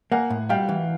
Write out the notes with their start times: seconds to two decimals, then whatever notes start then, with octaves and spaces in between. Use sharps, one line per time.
0.12 A#3 F#5 G#5
0.30 A2
0.49 G3 F5 G5
0.69 E3